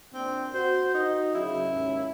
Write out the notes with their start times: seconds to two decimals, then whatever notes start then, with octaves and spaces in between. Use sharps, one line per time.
0.14 A#2 C4 D4
0.54 F#4 C5
0.94 D#4
1.35 F#2 C#3 E4
1.68 D#2 G#2 C#4